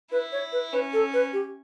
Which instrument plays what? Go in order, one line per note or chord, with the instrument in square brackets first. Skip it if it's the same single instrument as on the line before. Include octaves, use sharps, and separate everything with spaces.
[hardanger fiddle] E4 [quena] B4
[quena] C#5
B4
[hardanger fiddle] C#4 [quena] B4
[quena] A4
B4
G4